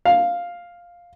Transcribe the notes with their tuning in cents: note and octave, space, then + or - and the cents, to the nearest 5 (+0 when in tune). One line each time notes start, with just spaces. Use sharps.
F5 +5